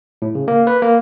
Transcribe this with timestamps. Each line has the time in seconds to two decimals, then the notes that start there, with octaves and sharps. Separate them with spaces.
0.22 A2
0.35 C#3
0.48 A#3
0.67 B4
0.82 A#3